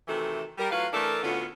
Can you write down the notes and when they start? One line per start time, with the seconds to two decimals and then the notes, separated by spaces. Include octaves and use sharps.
0.08 C3 D#3 E3 A3 F#4 A4
0.58 G3 A#4
0.70 A2 F#3 F4 B4 F5
0.93 E3 A3 D4 A4 A#4
1.23 D2 A2 D3 B3 C#4 F4